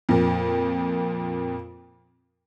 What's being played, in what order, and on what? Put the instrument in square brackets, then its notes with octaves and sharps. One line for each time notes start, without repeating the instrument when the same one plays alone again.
[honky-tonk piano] F2 A#2